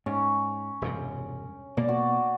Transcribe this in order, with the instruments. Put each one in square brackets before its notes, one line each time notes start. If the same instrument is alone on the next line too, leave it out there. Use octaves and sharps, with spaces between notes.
[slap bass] G#2 [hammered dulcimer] C#4
[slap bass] E1 G2 C3
[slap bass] B2 A#3 [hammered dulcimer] D5
[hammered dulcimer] F#4